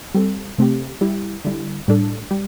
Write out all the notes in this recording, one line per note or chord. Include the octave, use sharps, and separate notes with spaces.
G3 C4 A4
C3 A3 C4 G4
G3 E4 G4
D3 G3 E4
A2 G3 D4 A4
G3